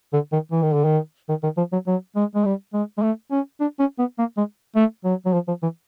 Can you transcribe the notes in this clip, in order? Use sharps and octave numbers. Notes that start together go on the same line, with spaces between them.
D3
D#3
E3
D#3
D3
D#3
D#3
D#3
F3
F#3
F#3
G#3
G#3
G3
G#3
G#3
A3
C#4
D4
C#4
B3
A#3
G#3
A3
F#3
F#3
F3
F3
E3